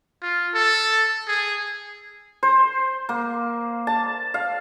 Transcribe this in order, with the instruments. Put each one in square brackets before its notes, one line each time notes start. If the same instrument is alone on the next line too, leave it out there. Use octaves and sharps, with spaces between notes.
[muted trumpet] F4
A4
G#4
[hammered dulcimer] C5
A#3
A5
F5